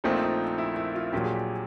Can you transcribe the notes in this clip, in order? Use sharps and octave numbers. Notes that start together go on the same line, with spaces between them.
A#1 A#2 F3 A3 C4 D#4
D#4
E4
E4
F4
A#1 A#2 F#3 G4
G#4
G4